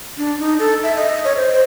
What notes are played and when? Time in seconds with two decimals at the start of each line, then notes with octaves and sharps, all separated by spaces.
0.18 D4
0.39 D#4
0.59 A4
0.83 E5
0.96 D#5
1.24 C#5
1.36 C5
1.53 C5